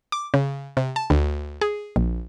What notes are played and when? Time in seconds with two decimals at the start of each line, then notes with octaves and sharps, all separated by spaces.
0.12 D6
0.34 C#3
0.77 C3
0.96 A5
1.10 D2
1.61 G#4
1.96 A#1